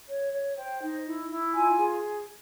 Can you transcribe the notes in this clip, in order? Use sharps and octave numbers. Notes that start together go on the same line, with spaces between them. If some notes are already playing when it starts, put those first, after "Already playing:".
C#5
C#5
C5 G5
D#4
E4
E4
F4 G#5
G#4